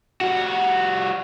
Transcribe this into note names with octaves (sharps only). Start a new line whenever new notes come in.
G3 F#4